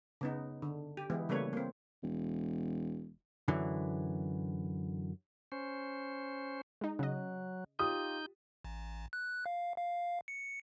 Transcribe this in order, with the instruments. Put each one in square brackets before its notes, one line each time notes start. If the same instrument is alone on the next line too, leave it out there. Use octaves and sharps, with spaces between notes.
[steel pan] C#3 B3 D#4
D3
G4
E3 G#3 B3 E4
C#3 G3 A3 A#3 B4 C#5
A#3 C4
[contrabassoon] E1
[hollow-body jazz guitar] F#2 D3 E3
[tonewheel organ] C#4 C5
[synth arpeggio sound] G#3 D#4
[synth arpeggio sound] C#3 D#5 [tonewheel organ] F#3
[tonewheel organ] D#4 G6 [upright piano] F4 G4 D#6
[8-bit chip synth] A1
F#6
F5
F5
C#7